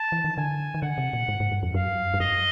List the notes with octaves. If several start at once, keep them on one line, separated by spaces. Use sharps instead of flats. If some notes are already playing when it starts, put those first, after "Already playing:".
Already playing: A5
E3
D#3
D3 G#5
D#3
D3 F#5
C3
A#2
G#2
G#2
G2
F2
F#2 F5
G2
F#2 D#5